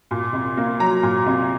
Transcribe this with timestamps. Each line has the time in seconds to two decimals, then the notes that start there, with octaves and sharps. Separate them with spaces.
0.11 A#2
0.33 C2
0.57 A#3
0.79 F#3 A#5
1.03 A#2
1.26 C2